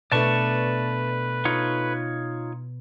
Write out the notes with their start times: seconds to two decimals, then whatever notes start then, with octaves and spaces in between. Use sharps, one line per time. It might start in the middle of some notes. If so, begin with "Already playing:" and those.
0.12 B2 A3 D4 B4 D5 A5 C#6
1.45 D#4 F4 C#5